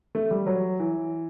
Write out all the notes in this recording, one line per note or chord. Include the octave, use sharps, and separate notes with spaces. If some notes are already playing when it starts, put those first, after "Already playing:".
A3
G3
F#3
E3